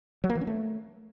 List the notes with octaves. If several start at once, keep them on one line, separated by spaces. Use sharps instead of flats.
F#3
A#3
E3
C#4
A3